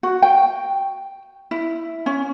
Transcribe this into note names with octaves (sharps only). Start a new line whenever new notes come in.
F#4
G5
E4
C#4